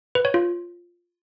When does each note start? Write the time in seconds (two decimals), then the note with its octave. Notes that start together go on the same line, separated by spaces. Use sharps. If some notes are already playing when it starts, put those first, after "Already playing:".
0.15 B4
0.25 C#5
0.34 F4